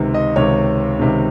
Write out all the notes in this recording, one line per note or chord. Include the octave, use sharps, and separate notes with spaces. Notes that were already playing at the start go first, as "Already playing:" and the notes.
Already playing: C#2 C3 D#3
D#5
C#2 C3 D#3 C#5
C#2 C3 D#3